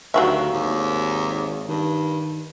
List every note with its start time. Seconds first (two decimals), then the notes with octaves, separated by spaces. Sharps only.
0.14 D2 D#3 F#3 G3 E5 F5 C#6 F#7
0.53 G#1 D#2
1.68 G2 D#3